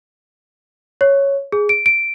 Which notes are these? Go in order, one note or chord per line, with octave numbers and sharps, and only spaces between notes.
C#5
G#4
D7
D7